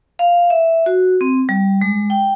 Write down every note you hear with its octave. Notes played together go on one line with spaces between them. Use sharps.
F5
E5
F#4
C4
G3
G#3
G5